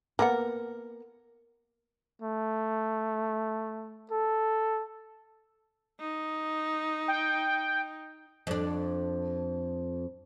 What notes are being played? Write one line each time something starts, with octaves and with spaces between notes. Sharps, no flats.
A#3 B3 A#4 F#5
A3
A4
D#4
G5
F2 D4